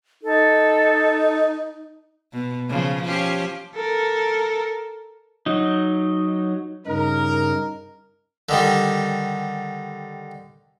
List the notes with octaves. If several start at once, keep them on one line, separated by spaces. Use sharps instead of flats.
D#4 A4
B2
C#3 F3
F3 C#4 G4
A4 A#4
F#3 D#4
G2 C#3 D#4 A#4
D3 D#3 G3